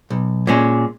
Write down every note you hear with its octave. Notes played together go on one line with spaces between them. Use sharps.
B1
A#2 G#3 C#4